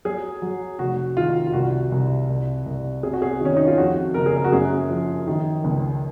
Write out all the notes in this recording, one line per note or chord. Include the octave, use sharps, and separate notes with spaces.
F#3 G#4
F#3
F1 F#4
D#3 F4
F4
C2 F#4
C2
C2
C2
C3 G#4
F#4
G#4
D#3 C#4
D#4
F4
F2 F#4
F#1 A#4
G#4
A#4
F#4
F#2 G#4
F3
D#3
C#2